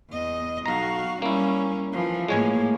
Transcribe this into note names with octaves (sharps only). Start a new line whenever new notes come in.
E2 D#5
B1 F#4 F5 A#5
G3 A#3 C#4 E4
E3 F3
A2 G#3 A#3 C#5 G#5